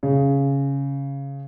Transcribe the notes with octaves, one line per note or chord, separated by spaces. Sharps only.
C#3